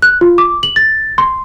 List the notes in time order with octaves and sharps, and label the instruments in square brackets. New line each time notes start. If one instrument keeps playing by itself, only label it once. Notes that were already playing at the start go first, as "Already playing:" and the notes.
[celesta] F#6
F4
D6
F#7
A6
C6